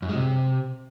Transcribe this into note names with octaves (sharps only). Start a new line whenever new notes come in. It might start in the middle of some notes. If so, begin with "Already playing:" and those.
F#2
G#3
C3